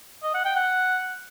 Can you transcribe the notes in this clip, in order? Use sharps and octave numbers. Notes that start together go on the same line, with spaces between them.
D#5
F#5
G5
F#5